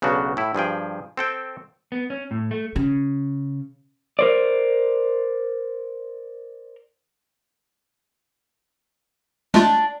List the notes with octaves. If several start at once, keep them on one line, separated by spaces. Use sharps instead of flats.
B1 C#3 F#3 D4 F#4
A2 E4
G2 F3 G#4 G5
C4 A4 G5
B3
C#4
A2
A3
C#3
A#4 C5 D5
G#3 A3 D4 F4